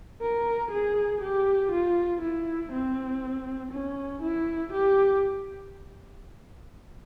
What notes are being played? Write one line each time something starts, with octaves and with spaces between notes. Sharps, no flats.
A#4
G#4
G4
F4
E4
C4
C#4
E4
G4